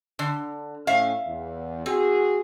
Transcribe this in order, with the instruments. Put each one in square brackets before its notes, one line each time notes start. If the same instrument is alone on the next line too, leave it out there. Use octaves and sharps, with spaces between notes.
[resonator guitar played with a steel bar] D3
[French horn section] A2 C#4 [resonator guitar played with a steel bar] E5 F5
[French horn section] E2
[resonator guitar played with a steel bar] C4 [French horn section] F#4 G#4